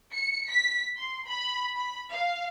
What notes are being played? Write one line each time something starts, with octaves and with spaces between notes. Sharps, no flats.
C#7
B6
C6
B5
B5
F5